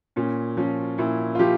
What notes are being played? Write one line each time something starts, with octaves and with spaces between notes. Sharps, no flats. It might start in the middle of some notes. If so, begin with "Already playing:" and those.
A#2 C#4
F3 C#4
A#2 E4
F4
F3 G4